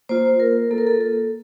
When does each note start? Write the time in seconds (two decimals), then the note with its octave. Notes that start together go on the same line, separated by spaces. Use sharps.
0.09 A#3 F4 C5
0.40 A#4
0.71 A#3 F4 A4
0.78 A#4
0.87 A4
1.01 A4